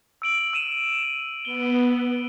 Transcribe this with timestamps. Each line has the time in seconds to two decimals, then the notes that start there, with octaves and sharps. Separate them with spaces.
0.22 E6 D7 F#7
0.53 E6 D#7 E7
1.03 E7
1.45 B3 G7